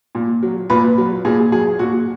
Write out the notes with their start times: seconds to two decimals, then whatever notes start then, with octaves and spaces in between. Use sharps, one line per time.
0.15 A#2
0.43 F#3
0.70 A#2 B4
0.98 F#3
1.25 A#2 G#4
1.52 F#3 G#4
1.79 A#2 F#4